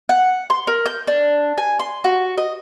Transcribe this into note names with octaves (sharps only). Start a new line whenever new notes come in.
F#5
C6
A#4
G6
D4
G#5
C6
F#4
D#5